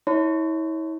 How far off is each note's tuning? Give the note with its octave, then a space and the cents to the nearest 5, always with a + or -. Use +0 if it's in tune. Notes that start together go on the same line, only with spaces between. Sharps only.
E4 -40 C#5 +0 C6 -45